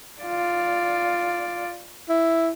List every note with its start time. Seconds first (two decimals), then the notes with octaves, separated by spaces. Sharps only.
0.22 F4 D5
2.09 E4